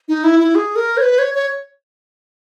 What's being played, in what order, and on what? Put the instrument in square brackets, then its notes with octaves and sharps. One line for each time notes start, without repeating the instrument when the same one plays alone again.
[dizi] D#4
E4
E4
G#4
A#4
C#5
B4
C#5
C#5